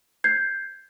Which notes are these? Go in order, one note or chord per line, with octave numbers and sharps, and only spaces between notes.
G6 G#6 C7